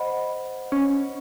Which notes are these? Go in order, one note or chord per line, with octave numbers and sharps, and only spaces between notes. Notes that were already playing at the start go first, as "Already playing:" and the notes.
Already playing: C5 D#5 F#5 B5
C#4